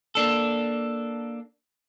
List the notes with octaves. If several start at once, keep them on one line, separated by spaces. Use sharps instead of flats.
A#3 D4 A4